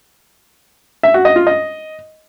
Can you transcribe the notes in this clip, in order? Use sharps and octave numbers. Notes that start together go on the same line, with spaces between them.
E5
F#4
D#5
F4
D#5